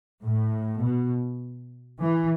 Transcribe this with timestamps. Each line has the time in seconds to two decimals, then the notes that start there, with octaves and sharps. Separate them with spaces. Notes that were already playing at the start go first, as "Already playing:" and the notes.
0.25 A2
0.83 B2
2.01 E3